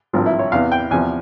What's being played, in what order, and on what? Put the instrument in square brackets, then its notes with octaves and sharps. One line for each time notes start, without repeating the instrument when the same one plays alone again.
[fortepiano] G#1 G2 F3 F4
E4
C#5
E2 C3 E3 F5
G5
E2 C3 F3 G#5